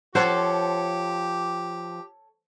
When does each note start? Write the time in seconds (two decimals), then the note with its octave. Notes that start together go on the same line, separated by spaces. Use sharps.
0.15 F3 G4 A4 C5 C#5 F#5